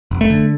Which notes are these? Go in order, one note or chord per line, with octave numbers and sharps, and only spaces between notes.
F1
A3
D3